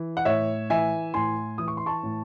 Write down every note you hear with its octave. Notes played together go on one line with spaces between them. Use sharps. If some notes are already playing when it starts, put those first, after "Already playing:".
Already playing: E3
F#5
A2 C#5 E5
E3 E5 G#5
A2 G#5 C6
E3 D#6
C#6
C6
A5 C#6
A2